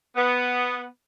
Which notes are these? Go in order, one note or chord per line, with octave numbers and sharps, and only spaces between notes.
B3